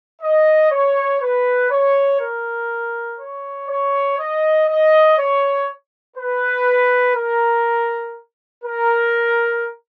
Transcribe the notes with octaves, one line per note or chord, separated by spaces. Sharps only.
D#5
C#5
B4
C#5
A#4
C#5
C#5
D#5
D#5
C#5
B4
A#4
A#4